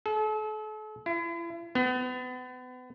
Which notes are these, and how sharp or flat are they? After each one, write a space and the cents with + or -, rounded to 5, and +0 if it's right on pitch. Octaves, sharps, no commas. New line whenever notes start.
A4 -40
E4 +40
B3 +35